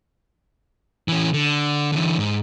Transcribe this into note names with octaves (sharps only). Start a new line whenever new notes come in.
E3 C#4
D3
D3 E3
G#2